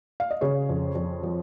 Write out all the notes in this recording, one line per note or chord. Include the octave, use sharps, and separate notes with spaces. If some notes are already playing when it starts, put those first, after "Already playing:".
F5
D#5
C#3 G#4 C#5
F2
F2
F3